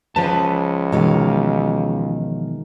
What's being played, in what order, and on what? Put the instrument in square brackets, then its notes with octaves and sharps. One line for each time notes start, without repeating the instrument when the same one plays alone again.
[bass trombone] C#2 [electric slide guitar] F3 A5 [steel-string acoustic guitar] B4 C5
[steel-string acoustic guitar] B2 E3 F5 [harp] D#3 G#3